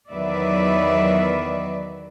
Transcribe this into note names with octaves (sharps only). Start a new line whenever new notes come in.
E2 D#3 F#3 B4 D5 E5